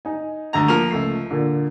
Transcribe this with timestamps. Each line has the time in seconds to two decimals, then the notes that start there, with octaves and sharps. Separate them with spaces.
0.05 D#4 G#5
0.53 D2 D3 A#5
0.68 F3 A#3 F6 F7
0.90 C#2 A3 C7
1.31 A#2 D3